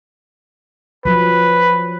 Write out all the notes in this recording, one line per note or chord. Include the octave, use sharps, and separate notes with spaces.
F3 F#3 B4